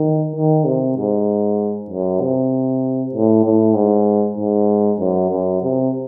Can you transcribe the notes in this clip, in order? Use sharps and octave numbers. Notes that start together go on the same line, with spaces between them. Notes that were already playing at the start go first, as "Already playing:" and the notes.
Already playing: D#3
D#3
C3
G#2
F#2
C3
A2
A2
G#2
G#2
F#2
F#2
C3